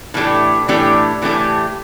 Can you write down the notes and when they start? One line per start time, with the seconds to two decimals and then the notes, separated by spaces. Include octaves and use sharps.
0.14 A2 E3 A3 D4 G4
0.68 A2 E3 A3 D4 G4
1.22 A2 E3 A3 D4 G4